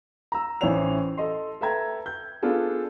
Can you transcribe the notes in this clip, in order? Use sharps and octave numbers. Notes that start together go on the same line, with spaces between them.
A#5 E6
A1 E3 C#4 C5 C#5 F7
A4 D#5 C6
A4 B4 E5 G5 A#5 G#6
G6
B3 D4 F4 G#4 A4